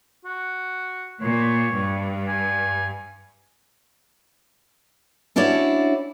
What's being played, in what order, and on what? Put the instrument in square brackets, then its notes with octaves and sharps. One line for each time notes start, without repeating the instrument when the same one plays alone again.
[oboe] F#4
[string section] A#2 [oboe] C#5
[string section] G2
[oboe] G#5
[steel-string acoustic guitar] C#4 D4 E4 F#4 C#5 D5